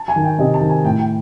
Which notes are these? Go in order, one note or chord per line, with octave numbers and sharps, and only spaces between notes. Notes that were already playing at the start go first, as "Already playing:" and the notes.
Already playing: A5
G#5
D#3
G5
C3 D#5
A5
D#3
G#5
A2 G5
G5